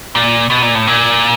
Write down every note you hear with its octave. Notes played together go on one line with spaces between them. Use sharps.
A#2
B2
A#2
A2
A#2